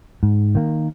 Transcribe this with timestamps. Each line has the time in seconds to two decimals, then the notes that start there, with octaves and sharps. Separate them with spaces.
0.23 G#2
0.55 D#3 A#3